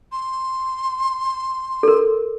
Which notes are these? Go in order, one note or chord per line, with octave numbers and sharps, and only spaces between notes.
C6
A4 A#4